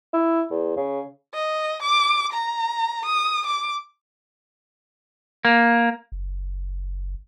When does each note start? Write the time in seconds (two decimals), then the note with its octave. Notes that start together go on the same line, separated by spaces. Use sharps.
0.13 E4
0.51 E2
0.76 C#3
1.33 D#5
1.83 D6
2.33 A#5
3.06 D#6
3.47 D6
5.45 A#3
6.12 F#1